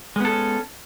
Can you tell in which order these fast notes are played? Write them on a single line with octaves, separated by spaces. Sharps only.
G#3 B3 A4 C#4